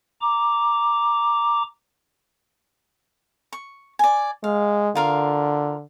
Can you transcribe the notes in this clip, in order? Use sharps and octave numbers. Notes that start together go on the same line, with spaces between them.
A#5 D6
C#6
D5 G#5
G#3 F5
D3 F4 A#4 F5